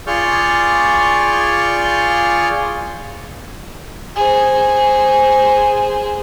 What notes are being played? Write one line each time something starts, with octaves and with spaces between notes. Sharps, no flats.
F4 G#4 D5 C#6 F6 G6
G#4 C5